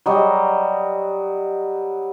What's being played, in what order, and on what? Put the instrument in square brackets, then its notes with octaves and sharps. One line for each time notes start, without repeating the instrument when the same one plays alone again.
[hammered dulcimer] F#3 G3 D#5